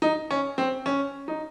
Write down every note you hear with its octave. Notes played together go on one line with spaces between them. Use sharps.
D#4
C#4
C4
C#4
D#4